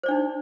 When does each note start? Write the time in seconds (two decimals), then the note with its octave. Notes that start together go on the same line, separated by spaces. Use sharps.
0.03 C5
0.06 D5
0.08 D4
0.11 D#4